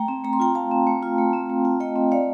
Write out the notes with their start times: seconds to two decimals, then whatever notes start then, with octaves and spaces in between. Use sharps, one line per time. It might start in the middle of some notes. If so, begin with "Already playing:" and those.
Already playing: A3 G5 A#5
0.08 C4
0.24 A3 A#5
0.33 C6
0.40 F4 G5 A#5
0.55 A3 F5 A5
0.71 C4
0.87 A3
1.03 F4
1.18 A3
1.33 C4
1.49 A3
1.65 F4
1.80 A3 D#5 G5
1.96 C4
2.12 A3 D5 F5